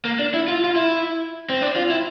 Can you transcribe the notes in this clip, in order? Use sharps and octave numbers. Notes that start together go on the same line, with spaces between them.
A#3
D4
E4
F4
F4
E4
C4
D4
F4
E4